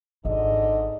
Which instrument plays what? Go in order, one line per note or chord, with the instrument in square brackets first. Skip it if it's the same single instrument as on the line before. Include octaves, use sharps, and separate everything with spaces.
[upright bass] G#1 [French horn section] G#2 D3 D#5